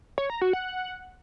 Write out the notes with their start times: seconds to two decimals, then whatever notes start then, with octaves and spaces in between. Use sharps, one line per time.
0.18 C#5
0.30 A#5
0.41 F#4
0.53 F#5